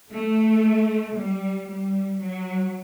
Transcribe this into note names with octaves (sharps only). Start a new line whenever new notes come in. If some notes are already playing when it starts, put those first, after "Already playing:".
A3
G3
G3
F#3